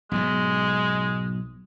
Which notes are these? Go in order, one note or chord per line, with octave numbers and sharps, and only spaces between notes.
B1 G#2 B2 G#3